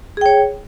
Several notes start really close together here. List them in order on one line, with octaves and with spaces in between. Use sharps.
G#4 G5 C#5